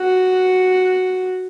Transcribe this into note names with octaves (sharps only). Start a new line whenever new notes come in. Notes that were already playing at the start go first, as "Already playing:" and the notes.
Already playing: F#4